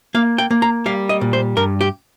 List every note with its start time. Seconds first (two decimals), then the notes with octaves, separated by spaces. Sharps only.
0.14 A#3 F5
0.38 G5
0.51 A#3
0.62 A#5
0.86 G3 F5
1.09 D#5
1.21 A#2
1.33 C5
1.57 G2 A#4
1.81 G4